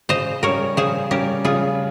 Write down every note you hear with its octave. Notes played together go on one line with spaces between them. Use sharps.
C#3 C5 D#5
G3 C#4 A#4 C#5
C#3 G#4 C5
G3 C#4 G4 A#4
C#3 F4 G#4